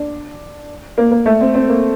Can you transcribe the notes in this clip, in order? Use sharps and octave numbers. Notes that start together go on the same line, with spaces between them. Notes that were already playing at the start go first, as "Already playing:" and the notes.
Already playing: D4
A#3
A#3
A3
C4
C4
A#3